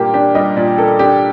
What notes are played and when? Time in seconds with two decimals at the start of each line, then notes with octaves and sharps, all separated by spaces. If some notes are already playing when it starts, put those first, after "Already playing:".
Already playing: A#2 G3 A#3 D4 G4
0.14 D4 G4
0.35 G3 D#5
0.57 A#2 D5
0.78 A#3 A4
0.99 D4 G4